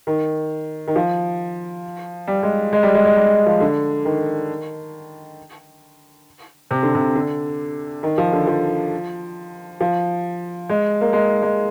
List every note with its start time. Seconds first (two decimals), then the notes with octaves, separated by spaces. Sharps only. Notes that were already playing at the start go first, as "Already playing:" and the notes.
0.07 D#3
0.87 D#3
0.96 F3
2.27 G3
2.43 G#3
2.73 G#3
2.83 G3
2.95 G#3
3.05 G#3
3.17 G3
3.46 F3
3.60 D3
4.05 D#3
6.71 C3
6.83 D3
6.95 C3
7.15 D3
8.03 D#3
8.18 F3
8.33 D3
8.47 F3
9.81 F3
10.69 G#3
11.01 A#3
11.13 G#3
11.43 G#3